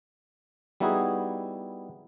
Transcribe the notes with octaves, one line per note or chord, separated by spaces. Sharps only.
G3 B3 D#4 E4 F#4 G#4